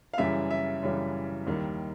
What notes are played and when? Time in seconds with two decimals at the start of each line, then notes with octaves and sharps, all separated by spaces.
0.14 F5
0.18 F#2 C#3 E3 G3 E5
0.51 E5
0.83 F#2 C#3 E3 G3
1.47 D#2 D#3 G3